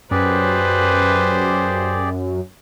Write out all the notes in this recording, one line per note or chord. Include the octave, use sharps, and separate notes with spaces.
F#2 G4 G#4 B4 C5 D5